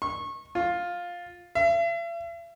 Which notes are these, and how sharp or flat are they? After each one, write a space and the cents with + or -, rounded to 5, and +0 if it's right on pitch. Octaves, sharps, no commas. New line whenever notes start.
C#6 -25
F4 +10
E5 +45